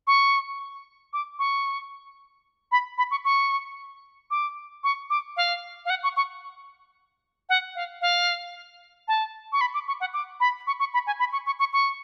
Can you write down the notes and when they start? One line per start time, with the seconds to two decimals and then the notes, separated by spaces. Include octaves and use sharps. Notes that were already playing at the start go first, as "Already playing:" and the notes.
0.07 C#6
1.13 D6
1.39 C#6
2.72 B5
2.98 B5
3.11 C#6
3.25 C#6
4.31 D6
4.84 C#6
5.10 D6
5.37 F5
5.85 F5
5.90 F#5
6.03 C#6
6.16 C#6
7.49 F#5
7.75 F5
8.01 F5
9.08 A5
9.52 C#6
9.61 B5
9.74 D6
9.87 C#6
10.00 F#5
10.13 D6
10.40 B5
10.67 C#6
10.79 C#6
10.94 B5
11.07 G#5
11.19 B5
11.32 C#6
11.46 C#6
11.59 C#6
11.73 C#6